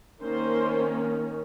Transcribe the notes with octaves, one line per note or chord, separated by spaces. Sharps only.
D#3 A#3 C#4 C5